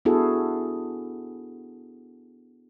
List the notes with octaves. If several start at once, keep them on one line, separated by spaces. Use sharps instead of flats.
B3 D4 E4 F#4 G#4 A4